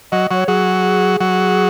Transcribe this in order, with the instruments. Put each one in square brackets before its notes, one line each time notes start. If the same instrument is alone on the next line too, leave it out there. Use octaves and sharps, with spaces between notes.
[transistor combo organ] F#3 [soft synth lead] D#5
[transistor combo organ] F#3 [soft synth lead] C#5
[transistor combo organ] F#3 [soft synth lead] G#4
[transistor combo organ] F#3